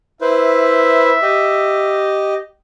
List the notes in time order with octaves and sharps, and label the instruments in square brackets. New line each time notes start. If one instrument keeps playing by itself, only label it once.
[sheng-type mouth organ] E4 B4 C5 [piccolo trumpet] E5
[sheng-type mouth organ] G4 D#5